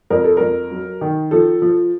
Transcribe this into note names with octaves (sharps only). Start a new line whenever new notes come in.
F2 A#4
A4
F2 A#4
F#3
D#3
F3 A4
F3